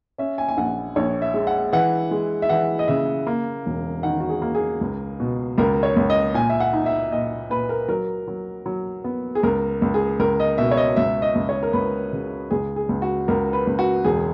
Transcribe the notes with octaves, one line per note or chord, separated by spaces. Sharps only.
C#4 E5
G#5
G#5
A#1 F#5
A#1 C#5
E5
G#3
F#5
E3 F#5
G#3
E5
E3 F#5
D#5
C#3 E5
A#3
E1
D#3 F#5
F#4
G#4
A#3
G#4
C#2
B2
C#2 A#4
C#5
C#2
D#5
A#2 G#5
E5
F#5
D#4
E5
A#2 D#5
A#2 B4
A#4
F#3 A#4
F#3
F#3
B3
G#4
C#2 A#4
C#2
G#4
C#2 A#4
D#5
B2 E5
C#5
D#5
C#2 E5
D#5
C#2
C#5
A#4
C#2 B4
C#3
C#2 G#4
G#4
C#2
F#4
C#2 A#4
B4
C#2
F#4
E1 G#4